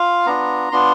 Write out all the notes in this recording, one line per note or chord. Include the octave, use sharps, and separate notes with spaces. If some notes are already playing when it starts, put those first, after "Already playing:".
Already playing: F4 F5
B3 D4 F4 A#5
B3 D4 F4 C6